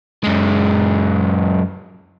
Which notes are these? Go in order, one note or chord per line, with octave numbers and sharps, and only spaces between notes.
F#2 G#3